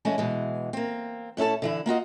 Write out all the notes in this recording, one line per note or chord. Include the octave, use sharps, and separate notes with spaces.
E3 G#3 A3 C#4
B2 E3 G#3
A#3 C4
A2 C#4 E4 A4 A5
D3 E3 E4
A#3 F4 F#4 D#5